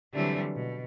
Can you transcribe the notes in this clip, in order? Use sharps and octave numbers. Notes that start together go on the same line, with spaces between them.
D3 E3 F#3 G3 A3 C4
B2